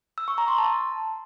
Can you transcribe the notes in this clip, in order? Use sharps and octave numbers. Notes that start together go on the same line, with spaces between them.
E6
C#6
A#5
C6
A5